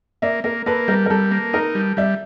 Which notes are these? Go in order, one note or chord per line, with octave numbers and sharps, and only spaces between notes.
A#3 D5 E5
A#3 A#4
A#3 A4 B4
G3 A#4
A#4
G3 A4
A#3
D#4 A#4
G3
G3 D5 E5